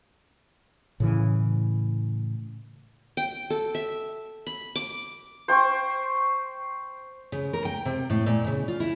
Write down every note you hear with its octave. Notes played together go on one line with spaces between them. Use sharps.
A2 C#3 E3
G5
A4
E5
B5
D6
C5 G5 C#6
C#3
A#4
G5
C3
A2
A#2
C#3
F4
E4